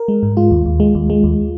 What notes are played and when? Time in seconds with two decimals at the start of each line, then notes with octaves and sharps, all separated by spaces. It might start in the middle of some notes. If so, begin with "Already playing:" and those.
Already playing: A#4
0.08 G#3
0.23 G#2
0.37 G#3 F4
0.51 D#2
0.66 D#2
0.80 G#3
0.95 D#2
1.10 G#3
1.24 D#2